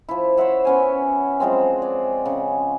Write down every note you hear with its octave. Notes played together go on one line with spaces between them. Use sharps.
F3 E4
C5 C#5 E5 F#5
B3 C#4 G#5
F3 F#3 G#3 C4
D5
C#3